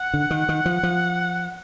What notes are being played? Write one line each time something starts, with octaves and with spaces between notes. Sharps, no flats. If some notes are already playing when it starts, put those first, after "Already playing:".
Already playing: F#5
D3
D#3
D#3
F3
F3